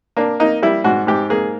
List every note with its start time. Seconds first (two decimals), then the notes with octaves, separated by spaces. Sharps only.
0.16 A#3 D4
0.40 A#3 D#4
0.62 G3 E4
0.84 G#2 F#4
1.07 G#2 G4
1.30 A#3 G#4